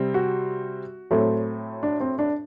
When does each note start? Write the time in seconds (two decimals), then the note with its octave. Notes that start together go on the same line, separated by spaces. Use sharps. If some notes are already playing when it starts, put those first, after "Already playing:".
Already playing: C3 G3 C4
0.14 F#4
1.11 A2 F#3 A3 C4
1.83 D4
2.00 C4
2.19 D4